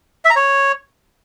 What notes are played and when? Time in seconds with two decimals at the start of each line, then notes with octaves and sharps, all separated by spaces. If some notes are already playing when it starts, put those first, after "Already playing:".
0.25 E5
0.30 A#5
0.36 C#5